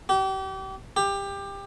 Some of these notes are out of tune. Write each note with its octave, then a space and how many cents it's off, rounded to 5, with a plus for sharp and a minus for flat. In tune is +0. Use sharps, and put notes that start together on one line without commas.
G4 -35
G4 +20